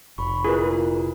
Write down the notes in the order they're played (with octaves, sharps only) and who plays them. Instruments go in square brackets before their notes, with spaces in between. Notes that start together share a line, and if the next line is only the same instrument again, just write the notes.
[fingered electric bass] F1 [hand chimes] B5 C#6
[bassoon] A#2 [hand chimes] E4 F4 A#4 [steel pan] G#4 B4